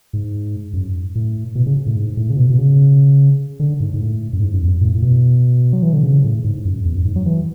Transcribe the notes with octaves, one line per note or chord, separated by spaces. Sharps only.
G#2
F#2
A2
B2
C#3
A2
G#2
A2
C#3
B2
B2
C#3
D3
G#2
G#2
A2
F#2
G#2
F#2
E2
F#2
A2
A2
B2
F#3
E3
D3
C#3
A2
G#2
F#2
E2
F#2
G#2
F#3
E3